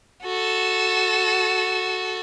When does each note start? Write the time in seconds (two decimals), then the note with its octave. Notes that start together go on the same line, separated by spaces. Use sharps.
0.23 F#4 A4